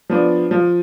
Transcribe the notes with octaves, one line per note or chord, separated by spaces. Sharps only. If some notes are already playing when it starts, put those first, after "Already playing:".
F3 B3 D4
F3